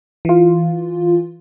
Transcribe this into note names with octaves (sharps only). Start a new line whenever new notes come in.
E3 F4